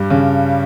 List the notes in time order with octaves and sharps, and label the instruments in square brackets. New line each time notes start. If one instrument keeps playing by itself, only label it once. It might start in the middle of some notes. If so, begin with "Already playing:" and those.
Already playing: [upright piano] G2 G3
C#3